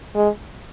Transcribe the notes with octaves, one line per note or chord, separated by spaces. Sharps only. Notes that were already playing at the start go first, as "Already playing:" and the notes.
G#3